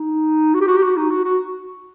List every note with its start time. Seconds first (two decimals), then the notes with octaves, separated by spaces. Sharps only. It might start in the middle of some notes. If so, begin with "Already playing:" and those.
Already playing: D#4
0.54 F#4
0.61 G4
0.68 F#4
0.77 G4
0.82 F#4
0.97 D#4
1.10 F#4
1.25 F#4